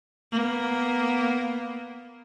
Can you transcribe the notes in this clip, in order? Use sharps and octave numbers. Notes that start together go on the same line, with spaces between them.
A#3 B3